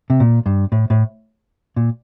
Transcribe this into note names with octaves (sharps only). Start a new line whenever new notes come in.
C3
A#2
G2
A2
A2
A#2